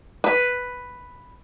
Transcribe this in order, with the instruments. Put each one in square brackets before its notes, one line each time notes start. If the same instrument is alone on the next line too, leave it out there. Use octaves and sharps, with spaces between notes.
[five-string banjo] B4